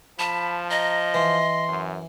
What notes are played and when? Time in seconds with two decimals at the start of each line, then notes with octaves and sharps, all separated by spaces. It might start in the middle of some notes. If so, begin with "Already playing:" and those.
0.19 F3 A5 B5
0.70 D#5 A#5
1.14 E3 C6
1.69 F#2